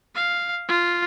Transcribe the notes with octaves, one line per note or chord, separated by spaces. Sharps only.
F5
F4